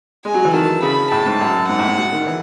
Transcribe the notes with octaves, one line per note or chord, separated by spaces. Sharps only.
G#3 G#5
F#3
E3
D#3 A5
C#3 B5
A2 A5
G#2
F#2
G#2 F#5
A2
G#2
B2
D#3
E3